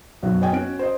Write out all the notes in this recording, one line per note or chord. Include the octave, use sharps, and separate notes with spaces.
B1 F#2 F#3 F#4
C#5 D#5 G5 G#5
C#4 F#4 D7
C5 D#5